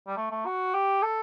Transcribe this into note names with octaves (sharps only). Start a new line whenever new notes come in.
G3
A3
A3
F#4
G4
A4